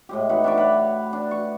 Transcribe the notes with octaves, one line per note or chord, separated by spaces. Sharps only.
A2 G#3 G4
D#4 F#4 B4
D4 E5 C#6 D6
B4 C#5
D4
C#6